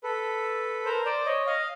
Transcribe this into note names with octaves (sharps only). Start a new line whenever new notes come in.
A4 B4
A#4 C5
C5 D5
C#5 D#5
D#5 F5